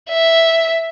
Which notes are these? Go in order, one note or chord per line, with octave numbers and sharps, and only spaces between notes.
E5